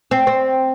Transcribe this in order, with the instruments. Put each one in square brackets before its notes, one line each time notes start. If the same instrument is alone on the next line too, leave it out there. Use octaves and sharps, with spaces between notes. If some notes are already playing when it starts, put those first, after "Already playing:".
[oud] C4
C4